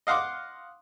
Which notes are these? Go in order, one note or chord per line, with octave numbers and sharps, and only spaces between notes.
D#5 F5 F#5 C6 D6